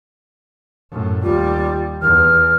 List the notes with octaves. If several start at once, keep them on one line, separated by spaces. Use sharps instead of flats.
F#2 A2
D#2 G3 F4
E2 F6